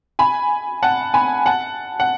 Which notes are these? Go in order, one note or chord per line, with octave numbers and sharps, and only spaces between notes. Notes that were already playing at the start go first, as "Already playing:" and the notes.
G#5 B5
F#5 A5
G#5 B5
F#5 A5
F#5